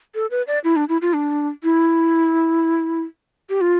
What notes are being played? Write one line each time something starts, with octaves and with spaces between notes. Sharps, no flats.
A4
B4
D5
E4
D4
E4
F4
D4
E4
G4
F4